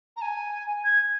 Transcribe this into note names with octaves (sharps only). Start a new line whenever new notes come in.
A#5
G#5
G#6